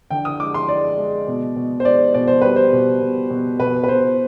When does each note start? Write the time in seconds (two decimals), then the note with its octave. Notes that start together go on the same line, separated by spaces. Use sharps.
0.11 D3 G5
0.25 D#6
0.40 G#3 D6
0.54 C6
0.69 G#3 D5
0.98 G#3
1.28 B2
1.56 B2
1.80 C5
1.85 G#3 D5
2.14 B2 D5
2.28 C5
2.41 G3 B4
2.56 C5
2.73 B2
3.01 B2
3.30 B2
3.60 B2 B4
3.84 B4
3.88 B2 C5